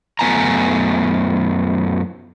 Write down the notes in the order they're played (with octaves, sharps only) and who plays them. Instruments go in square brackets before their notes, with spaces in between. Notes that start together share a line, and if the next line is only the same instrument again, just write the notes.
[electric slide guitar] F#2 A3 B3 G#5 A#5